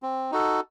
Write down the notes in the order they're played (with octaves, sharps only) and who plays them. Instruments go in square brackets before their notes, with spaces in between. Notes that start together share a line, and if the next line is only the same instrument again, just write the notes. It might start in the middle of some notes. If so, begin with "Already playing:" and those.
[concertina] C4
D#4 F#4 A4